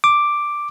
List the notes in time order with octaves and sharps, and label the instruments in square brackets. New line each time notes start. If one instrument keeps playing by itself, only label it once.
[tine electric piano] D6